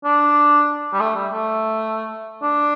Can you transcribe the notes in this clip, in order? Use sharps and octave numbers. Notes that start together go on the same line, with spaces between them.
D4
G3
A3
G3
A3
D4